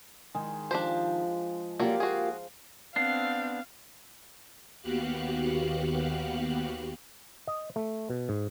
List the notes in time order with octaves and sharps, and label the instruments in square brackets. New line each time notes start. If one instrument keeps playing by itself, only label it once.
[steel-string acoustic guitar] D#3 [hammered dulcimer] G#3 G#5
[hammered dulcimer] F3 [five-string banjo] D4 G4 C5
[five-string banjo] F#3 A4 D5 [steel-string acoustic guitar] A#3 F4 G4 [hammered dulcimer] C5 F5
[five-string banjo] F#4 G#4
[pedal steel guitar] B3 D4 [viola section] C4 [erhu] F5 [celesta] C7
[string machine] D#2 B3 F#4 G4 F5 F#6
[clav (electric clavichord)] D#5
A3
B2
G#2